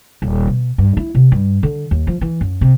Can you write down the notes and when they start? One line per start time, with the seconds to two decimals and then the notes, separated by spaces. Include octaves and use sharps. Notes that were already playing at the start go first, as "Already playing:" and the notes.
0.22 D#1
0.47 B2
0.78 G2
0.97 E4
1.15 C3
1.32 G2
1.63 D3
1.91 D#2
2.07 F3
2.21 E3
2.41 F#2
2.61 C3